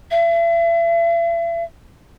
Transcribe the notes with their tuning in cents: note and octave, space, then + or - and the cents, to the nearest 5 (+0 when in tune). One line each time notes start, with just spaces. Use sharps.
E5 +40